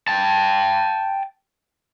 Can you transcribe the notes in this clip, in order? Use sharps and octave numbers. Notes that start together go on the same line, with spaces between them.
G5 A5